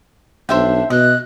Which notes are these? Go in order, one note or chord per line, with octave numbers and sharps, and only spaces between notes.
B1 D4 C5 E5 G5
B2 D#5 F#6